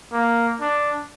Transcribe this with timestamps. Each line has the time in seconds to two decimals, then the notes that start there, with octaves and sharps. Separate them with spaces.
0.12 A#3
0.61 D4